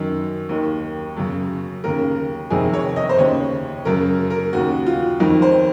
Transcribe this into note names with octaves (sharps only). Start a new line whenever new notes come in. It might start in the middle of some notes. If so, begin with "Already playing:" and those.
Already playing: F#2 D#3
D#2 D#3
F#2 C#3
D#2 C#3 A#4
F2 C3 D#3 G#4
C#5
D#5
C5
D#2 C#3 C#5
F#2 C#3 A#4
A#4
D#2 C#3 F#4
F4
F2 D#3 D#4
C5